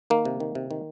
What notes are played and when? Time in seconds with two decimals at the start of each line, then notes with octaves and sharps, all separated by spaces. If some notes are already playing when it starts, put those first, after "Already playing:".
0.10 D#3 A#3
0.25 C3
0.40 D#3
0.55 C3
0.71 D#3